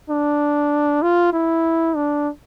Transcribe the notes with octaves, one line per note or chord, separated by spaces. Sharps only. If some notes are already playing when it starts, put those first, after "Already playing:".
D4
F4
E4
D4